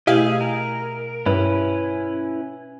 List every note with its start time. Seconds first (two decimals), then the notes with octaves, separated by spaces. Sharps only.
0.07 B2 A3 E4 G4 G#4 D#5 F5
0.41 A#4
1.26 G2 C#4 E4 B4